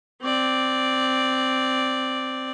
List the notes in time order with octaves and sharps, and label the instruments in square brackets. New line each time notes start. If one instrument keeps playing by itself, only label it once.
[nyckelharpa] C4 D5